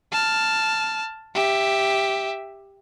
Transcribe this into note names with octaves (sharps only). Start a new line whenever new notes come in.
A5 F6
G4 E5